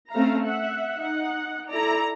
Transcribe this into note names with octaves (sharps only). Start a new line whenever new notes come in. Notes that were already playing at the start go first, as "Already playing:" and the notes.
A3 C4 C#4 F5 A#5
E5 F#5
D#4 F#5
E4 A4 D5 A#5